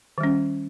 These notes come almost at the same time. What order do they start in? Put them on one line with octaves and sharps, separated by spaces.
D#3 G3 C#4